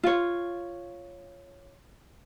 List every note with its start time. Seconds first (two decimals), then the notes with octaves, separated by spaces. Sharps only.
0.03 F4 C#5